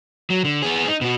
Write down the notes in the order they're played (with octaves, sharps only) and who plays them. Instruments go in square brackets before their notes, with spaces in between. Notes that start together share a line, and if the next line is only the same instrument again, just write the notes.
[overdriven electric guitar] F#3
D3
B3 G#4
D#4
B2 F#4